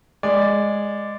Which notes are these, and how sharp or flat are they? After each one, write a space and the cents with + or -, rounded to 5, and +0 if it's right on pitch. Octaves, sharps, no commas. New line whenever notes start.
G#3 -10 D5 +5